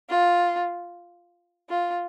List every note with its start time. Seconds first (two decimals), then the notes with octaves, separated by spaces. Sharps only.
0.10 F4
1.70 F4